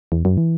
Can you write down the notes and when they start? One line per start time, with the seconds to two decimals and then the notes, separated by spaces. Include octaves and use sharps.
0.12 E2
0.25 F#2
0.37 E3